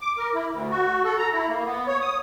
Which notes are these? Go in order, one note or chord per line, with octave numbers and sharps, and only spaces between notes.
D6
A#4
E4
D2
F#4
A4
A#5
E4
A#3
B3
C#5
D#6